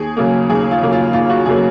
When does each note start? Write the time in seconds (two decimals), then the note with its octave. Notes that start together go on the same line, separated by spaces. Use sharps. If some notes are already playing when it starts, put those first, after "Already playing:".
Already playing: D#2 G#4
0.17 C#3 F#3 A#3
0.49 D#2 G#4
0.71 F4
0.82 C#3 F#3 A#3
0.92 F4
1.13 D#2 F4
1.30 F#4
1.46 C#3 F#3 A#3 G#4